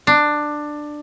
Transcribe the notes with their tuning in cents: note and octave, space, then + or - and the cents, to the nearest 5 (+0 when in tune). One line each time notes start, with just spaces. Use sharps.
D4 +15